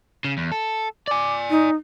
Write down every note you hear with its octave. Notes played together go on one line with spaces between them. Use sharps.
C#3
E2
A4
D5 G#5 D6
D#4